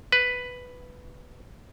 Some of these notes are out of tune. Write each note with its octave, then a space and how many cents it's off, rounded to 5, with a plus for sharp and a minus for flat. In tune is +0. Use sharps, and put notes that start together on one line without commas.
B4 +5